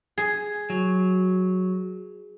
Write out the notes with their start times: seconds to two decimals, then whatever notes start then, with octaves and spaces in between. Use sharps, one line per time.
0.18 G#4
0.70 F#3